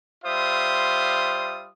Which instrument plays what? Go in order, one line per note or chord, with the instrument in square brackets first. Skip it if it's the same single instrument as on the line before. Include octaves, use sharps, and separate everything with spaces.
[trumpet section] G3 F4 C5 E5 D#6